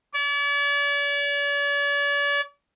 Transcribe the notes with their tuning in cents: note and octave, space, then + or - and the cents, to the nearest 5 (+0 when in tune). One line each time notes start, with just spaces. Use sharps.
D5 -45